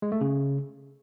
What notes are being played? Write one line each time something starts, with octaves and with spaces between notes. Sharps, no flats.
G#3
A3
C#3